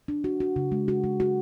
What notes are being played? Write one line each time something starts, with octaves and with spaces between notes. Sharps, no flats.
D4
F#4
F#4
C#3
G#3
F#4
G#3
F#4